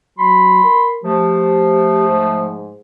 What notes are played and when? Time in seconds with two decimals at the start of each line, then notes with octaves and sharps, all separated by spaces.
0.18 F#3 B5 C6
0.65 A#4
1.04 F3 A3 G4
2.09 G#2